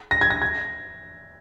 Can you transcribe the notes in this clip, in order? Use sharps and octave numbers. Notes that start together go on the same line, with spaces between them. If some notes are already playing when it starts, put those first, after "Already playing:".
A#6
G#6
A#6
G#6